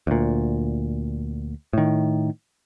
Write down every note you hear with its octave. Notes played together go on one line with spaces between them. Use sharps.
D2 A#2
A2 D#3